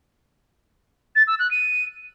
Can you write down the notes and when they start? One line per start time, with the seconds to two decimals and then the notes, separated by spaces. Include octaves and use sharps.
1.15 A6
1.27 E6
1.39 F#6
1.51 D#7